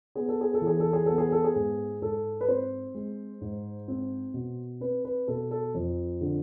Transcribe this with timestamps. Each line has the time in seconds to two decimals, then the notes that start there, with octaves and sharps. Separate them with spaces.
0.15 B3 G#4
0.29 A4
0.41 G#4
0.54 A4
0.61 E3
0.67 G#4
0.80 A4
0.93 G#4
1.06 B3 A4
1.18 G#4
1.32 A4
1.44 G#4
1.55 G#2
2.01 G#2 A4
2.41 B4
2.48 C4 C5
2.94 G#3
3.41 G#2
3.88 C4
4.34 B2
4.80 C4 B4
5.05 B4
5.28 B2 A4
5.51 A4
5.74 F2
6.21 D3